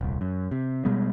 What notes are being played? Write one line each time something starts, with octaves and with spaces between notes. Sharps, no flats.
D#1 C2
F#2
C3
B2 G3 G#3 B3